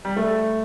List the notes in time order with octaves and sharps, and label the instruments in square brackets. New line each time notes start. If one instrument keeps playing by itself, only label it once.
[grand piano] G3
A3